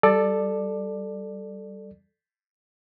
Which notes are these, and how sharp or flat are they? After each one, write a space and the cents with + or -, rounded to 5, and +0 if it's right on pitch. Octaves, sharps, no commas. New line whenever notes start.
G3 -10 A4 +0 D5 +15